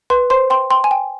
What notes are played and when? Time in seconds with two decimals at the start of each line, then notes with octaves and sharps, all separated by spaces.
0.10 B4 C6
0.30 C5 C6
0.50 G5 C6
0.71 G5 C6
0.84 G#5
0.91 G5